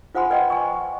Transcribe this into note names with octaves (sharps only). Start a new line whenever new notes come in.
F4 C5 F#5 G#5 B5 C6
B4 D5 D#5 F#5 G5
G#5 C#6